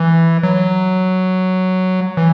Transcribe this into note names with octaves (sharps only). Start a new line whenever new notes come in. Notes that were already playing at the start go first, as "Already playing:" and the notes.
Already playing: E3
F#3
E3